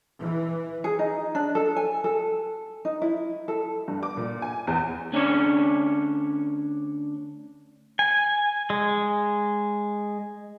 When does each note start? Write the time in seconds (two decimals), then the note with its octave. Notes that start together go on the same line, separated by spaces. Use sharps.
0.21 E3
0.84 G#4
0.99 D#4
1.35 D4
1.55 A4
1.76 G#5
2.04 A4
2.85 D#4
3.02 E4
3.48 A4
3.88 G2
4.03 D6
4.17 A#2
4.42 G#5
4.67 E2
5.12 D2 C#4 D4 C#5
7.99 G#5
8.70 G#3